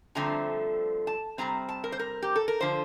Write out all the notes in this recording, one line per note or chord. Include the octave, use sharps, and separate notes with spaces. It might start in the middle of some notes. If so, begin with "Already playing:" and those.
G2 D3 F3 A3 C4 A#5
A5
C3 G3 C4 A#5
A5
A#4
C5
A#4
G4
A4
A#4
D3 F3 C5